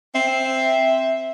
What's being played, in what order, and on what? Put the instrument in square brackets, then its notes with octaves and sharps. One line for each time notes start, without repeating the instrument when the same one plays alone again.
[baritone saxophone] C4 [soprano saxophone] E5